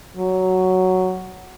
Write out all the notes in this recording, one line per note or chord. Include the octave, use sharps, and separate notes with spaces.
F#3